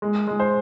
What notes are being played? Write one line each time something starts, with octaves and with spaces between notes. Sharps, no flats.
G#3
G#3
C5